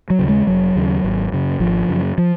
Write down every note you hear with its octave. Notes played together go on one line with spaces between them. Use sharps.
F#3
D#2 C#3
G#3
F1 F#3
D#2 C#3
G#1
F#2 C#3
G#1 F3
F#2 C#3
F3